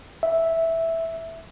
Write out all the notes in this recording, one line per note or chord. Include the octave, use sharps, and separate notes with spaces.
E5